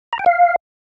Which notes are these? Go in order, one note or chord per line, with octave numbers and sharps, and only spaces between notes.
A#5
G5
F5